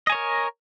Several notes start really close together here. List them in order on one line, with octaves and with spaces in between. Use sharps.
D#5 G#5 C#5 A#4